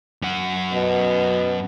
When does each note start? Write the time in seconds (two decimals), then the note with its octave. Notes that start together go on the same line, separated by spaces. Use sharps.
0.22 F#2 F#5
0.73 B2